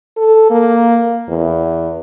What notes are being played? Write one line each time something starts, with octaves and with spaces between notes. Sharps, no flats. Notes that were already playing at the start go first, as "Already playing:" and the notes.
A4
A#3
E2